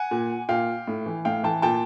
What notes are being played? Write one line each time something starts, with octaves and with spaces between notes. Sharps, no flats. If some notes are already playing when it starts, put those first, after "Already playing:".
Already playing: F#5 G#5
A#2
A#2 F5 G5
A2
E3
A2 F5 G5
E3 G5 A5
A#2 G5 A5